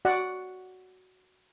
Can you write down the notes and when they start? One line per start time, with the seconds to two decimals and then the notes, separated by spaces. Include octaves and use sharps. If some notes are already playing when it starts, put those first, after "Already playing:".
0.05 F#4 D5 F#5